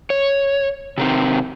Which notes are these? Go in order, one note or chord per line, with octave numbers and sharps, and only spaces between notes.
C#5
C3 D#3 C4